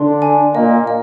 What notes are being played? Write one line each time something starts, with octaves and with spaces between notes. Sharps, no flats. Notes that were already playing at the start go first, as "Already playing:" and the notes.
Already playing: D3 D4 C6
G#5
A#2 A#3 D#5
D#5